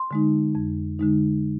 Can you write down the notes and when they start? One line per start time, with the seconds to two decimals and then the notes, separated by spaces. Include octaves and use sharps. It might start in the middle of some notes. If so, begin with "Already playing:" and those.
Already playing: C6
0.11 D3 G#3 D#4
0.55 F2
0.99 D3 G#3 D#4